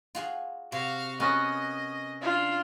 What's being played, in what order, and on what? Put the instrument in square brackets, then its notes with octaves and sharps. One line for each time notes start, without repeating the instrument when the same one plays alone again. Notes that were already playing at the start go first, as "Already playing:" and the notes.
[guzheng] F4 F#4 G#4
[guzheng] C3 [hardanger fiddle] F#4 F5
[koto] B3 C#4 F#4 [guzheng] A#4 [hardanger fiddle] D#5
[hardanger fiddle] D4 [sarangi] F4